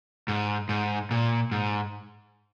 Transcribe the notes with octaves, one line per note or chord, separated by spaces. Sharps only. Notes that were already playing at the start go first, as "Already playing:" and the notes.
G#2
G#2
A#2
G#2